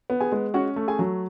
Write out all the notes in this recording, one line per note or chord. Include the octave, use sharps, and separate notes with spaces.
B3
G#4 G#5
G#3
C#4 F#4 F#5
A3
G#4 G#5
F#3